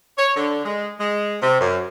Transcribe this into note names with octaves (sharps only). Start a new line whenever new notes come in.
C#5
D3
G#3
G#3
C3
F#2